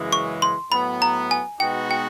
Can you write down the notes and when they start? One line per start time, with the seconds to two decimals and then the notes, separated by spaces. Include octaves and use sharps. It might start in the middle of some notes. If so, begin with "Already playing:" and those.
Already playing: F#2 C#3 E3 G#3
0.12 C#6
0.42 C6
0.71 A2 F#3 B3 B5
1.02 A#5
1.31 G#5
1.60 B2 G#3 B3 D#4 F#4 G5
1.91 G5